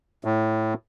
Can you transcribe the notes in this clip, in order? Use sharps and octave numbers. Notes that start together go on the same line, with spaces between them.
A2